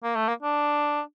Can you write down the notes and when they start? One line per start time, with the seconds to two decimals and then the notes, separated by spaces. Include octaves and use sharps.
0.04 A#3
0.16 A3
0.29 A#3
0.43 D4